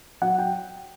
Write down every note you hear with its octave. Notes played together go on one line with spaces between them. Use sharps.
F#3 F#5
G5